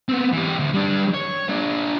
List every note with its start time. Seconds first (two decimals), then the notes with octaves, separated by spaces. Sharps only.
0.09 B3 C4
0.33 E3 G4
0.59 D2
0.74 G3 D4
1.14 C#5
1.50 D4 F4